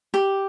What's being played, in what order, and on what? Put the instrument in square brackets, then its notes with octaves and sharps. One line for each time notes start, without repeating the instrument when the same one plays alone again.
[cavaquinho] G4